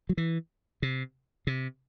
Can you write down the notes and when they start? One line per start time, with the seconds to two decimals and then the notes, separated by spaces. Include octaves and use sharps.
0.09 F#3
0.17 E3
0.82 C3
1.47 C3